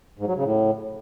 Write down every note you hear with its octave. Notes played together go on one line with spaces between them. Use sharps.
G#2
F#3
C#3
A2